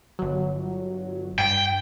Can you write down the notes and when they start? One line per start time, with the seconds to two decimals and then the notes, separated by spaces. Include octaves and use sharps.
0.19 G1 F#3
1.39 G2 G5